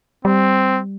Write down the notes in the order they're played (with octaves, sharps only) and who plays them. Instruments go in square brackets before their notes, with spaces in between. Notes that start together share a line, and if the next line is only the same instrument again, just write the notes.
[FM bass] G3 [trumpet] C4